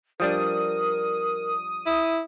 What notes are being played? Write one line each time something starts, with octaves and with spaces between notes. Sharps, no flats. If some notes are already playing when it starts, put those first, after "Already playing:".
F3 G3 D4 A#4 D#6
E4